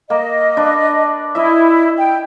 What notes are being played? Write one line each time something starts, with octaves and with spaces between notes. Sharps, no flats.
A#3 D#5
D4 B4
E4 D#5 E5
G5